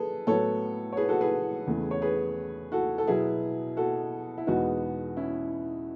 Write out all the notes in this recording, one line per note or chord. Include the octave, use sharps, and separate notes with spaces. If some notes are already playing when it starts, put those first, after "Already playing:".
Already playing: G#4 A4 B4
A2 F#3 B3 A4 C#5
C#5
G#4 B4
F#4 A4
G#4 B4
E2 C#3 E3 A3
C#5
G#4 B4
F#4 A4
A4
B2 F#3 B3 E4 G#4
F#4 A4
E4
E2 B2 G#3 B3 D#4 F#4
C#4 E4